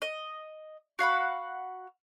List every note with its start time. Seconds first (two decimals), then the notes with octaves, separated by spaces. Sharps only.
0.02 D#5
0.99 F#4 F5 F#5 B5